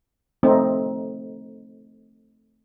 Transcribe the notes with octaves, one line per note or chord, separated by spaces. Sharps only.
A3 C4 D#4